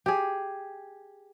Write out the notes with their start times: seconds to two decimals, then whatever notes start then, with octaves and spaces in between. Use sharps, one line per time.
0.06 G4 G#4